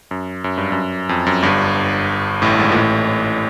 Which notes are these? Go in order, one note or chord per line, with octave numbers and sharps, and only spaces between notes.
F#2
F#2
G2
F#2
F2
F#2
G1 G2
A1 A2
G#1 G#2
A#2
A1 A2